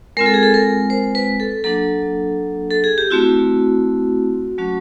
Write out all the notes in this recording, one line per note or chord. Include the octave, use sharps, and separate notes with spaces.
G#3 C4 F4 A#4
A4
G#4
A4
A#4
C5
B4
A4
F#3 A#3 D4 A4
A4
G#4
G4
A3 C4 E4 F#4
F#3 A3 C#4 F#4